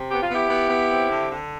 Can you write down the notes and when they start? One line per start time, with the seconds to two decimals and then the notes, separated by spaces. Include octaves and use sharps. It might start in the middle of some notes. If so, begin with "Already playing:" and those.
Already playing: C3
0.10 B3 G4
0.22 F4
0.30 B3 E4 G4
0.50 B3
0.70 B3
0.91 C4
1.10 D3
1.30 D3